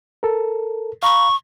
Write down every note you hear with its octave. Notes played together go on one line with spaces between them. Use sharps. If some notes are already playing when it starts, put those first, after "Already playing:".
A4 A#4
F5 A#5 B5 C#6